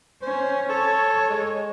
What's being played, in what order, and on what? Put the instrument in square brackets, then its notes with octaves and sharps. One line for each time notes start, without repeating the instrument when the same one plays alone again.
[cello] C#4 [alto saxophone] C5
[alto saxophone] A4 [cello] C#5
[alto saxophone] G#3